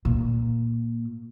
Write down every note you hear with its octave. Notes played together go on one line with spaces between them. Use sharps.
A#2